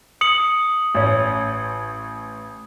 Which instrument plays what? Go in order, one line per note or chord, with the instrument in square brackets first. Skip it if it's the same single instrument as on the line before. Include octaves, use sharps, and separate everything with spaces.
[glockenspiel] D#6 C#7 F#7
[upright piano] A1 C#4